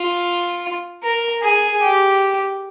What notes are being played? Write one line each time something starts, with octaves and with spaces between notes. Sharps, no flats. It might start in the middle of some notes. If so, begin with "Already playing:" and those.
Already playing: F4
A#4
G#4
G4